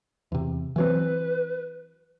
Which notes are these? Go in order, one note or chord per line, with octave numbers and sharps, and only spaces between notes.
E2 C3
E3 F#3 C4 B4